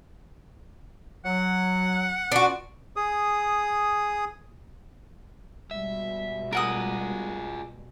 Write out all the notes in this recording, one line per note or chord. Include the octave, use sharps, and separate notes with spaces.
F#3 F#5
B3 C#4 D4 F4 F#4
G#4 D#6
B2 G3 G#3 E5
F4 G#4 A#4 F#5 D#6